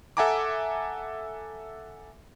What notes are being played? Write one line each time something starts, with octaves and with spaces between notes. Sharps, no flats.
A4 E5 F#5 G#5 A#5 D6